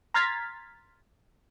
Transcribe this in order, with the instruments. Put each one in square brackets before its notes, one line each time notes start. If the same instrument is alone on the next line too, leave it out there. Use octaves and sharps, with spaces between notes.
[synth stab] A#5 C6 F6 G#6 A6 B6